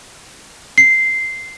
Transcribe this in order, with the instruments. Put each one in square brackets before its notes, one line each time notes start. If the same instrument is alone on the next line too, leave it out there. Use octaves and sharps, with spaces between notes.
[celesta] C7